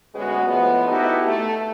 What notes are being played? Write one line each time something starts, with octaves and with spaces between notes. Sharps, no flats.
D2 G#3 B3 C#4 F#4 B4
A2 F3 G#3 B3
B3 D#4 E4 F#4 G4 A4
A3